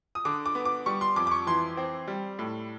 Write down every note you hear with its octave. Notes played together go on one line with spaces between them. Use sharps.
D#6
D3 D6
D6
B3
D6
G3 C#6
C6
F2 D6
D6
C#6
E3 C6
C4
G3
A2